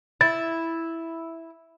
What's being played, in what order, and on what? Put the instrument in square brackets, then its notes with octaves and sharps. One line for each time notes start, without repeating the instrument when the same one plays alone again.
[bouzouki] E4 [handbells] A6